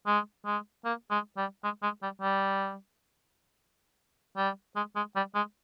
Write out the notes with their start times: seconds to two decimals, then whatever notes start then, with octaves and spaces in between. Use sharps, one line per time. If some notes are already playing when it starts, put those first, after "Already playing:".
0.07 G#3
0.45 G#3
0.85 A#3
1.10 G#3
1.37 G3
1.63 G#3
1.82 G#3
2.02 G3
2.22 G3
4.37 G3
4.76 G#3
4.96 G#3
5.16 G3
5.35 G#3